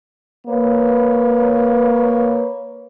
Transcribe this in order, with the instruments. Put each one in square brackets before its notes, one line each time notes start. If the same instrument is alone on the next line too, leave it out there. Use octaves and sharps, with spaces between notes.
[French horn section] A#3 B4 C#5